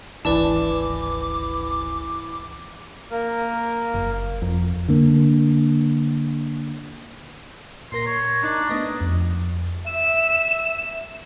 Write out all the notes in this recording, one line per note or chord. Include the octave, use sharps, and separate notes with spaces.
D1 G#1 E3 B4 D5 A5 D6
A#3 A#4
F#1
F2
D3 A#3
A#2 A#4 C6 A#6
C#5
D4 D#4 A#5 C#6
A3 B3 D4 D#5
F2
E5 E7